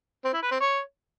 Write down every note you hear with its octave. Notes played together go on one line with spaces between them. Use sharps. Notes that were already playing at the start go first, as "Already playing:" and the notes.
C4
E4
B4
C4
C#5